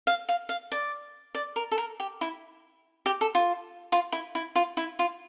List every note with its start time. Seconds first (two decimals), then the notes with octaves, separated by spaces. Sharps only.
0.07 F5
0.29 F5
0.49 F5
0.72 D5
1.35 D5
1.56 A#4
1.71 A4
1.78 A#4
2.00 G4
2.21 E4
3.06 G4
3.21 A4
3.35 F4
3.92 F4
4.12 E4
4.35 E4
4.56 F4
4.77 E4
4.99 F4